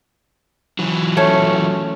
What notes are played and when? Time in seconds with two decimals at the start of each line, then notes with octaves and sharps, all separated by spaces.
0.79 E3 F#3
1.17 A3 C#4